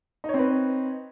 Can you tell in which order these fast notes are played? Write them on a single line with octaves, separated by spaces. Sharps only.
D#4 C#5 C4 B4